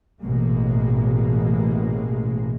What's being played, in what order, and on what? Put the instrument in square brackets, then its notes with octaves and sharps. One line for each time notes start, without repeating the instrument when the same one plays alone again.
[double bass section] A1 B2 G#3 A#3